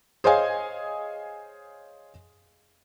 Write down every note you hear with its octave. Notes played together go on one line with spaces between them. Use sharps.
G#4 C5 C#5 D#5 F5 G#5